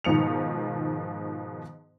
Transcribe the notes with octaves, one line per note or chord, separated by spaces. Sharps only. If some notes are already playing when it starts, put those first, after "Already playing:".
G#2 B2 D#3 F3 C#7 F7